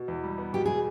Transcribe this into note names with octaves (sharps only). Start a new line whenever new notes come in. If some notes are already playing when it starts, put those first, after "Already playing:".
Already playing: B2
E2
G3
B3
B2 G4
G#4